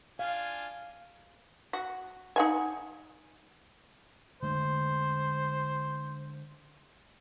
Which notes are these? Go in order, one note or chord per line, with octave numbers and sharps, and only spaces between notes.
D4 F4 F5 G#5
F#4
D#4 F#5 G#5
D3 G#3 A3 C5